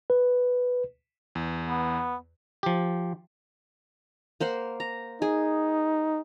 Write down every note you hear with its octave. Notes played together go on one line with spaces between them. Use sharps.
B4
E2
B3
F3 G4
A#3 C5 F#5
A#5
D#4 G#4